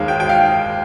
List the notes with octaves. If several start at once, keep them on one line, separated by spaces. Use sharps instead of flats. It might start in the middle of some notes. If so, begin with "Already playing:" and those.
Already playing: D#2 D#3 G#3 F5
G5
G5
F5